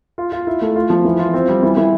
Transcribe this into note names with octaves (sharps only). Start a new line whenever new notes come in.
F4
F4
E4
A3
F4
F3
E3
F4
C4
G3
E3
E3